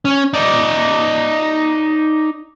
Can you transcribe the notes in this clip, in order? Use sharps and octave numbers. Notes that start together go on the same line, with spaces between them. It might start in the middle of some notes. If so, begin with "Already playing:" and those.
C#4
D#4 D5